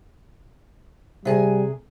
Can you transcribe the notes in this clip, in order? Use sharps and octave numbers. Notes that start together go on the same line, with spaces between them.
C3 G3 G#4 G#5